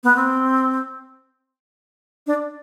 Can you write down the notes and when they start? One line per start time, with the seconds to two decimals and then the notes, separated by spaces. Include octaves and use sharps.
0.04 B3
0.16 C4
2.27 D4